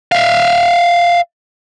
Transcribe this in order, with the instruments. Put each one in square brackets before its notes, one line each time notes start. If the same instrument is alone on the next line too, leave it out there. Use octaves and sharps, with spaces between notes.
[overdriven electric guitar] E5 F5